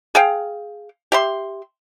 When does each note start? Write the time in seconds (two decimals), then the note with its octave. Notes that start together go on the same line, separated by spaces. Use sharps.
0.15 G#4 F5 G5
1.12 G4 E5 C6